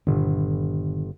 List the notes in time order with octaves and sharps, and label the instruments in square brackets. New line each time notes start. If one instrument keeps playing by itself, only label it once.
[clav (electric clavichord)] G1 [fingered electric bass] A#2 D#3 D4